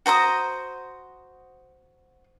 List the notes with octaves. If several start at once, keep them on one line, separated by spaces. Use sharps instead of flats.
F#4 C5 A#5 D#6